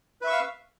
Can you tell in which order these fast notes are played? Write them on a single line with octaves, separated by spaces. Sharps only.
B4 E5 C#6 E6 F5